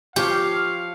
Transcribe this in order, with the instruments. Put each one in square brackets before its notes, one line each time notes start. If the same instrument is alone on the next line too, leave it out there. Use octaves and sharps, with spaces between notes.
[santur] F3 C#5 [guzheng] G4 [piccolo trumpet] F5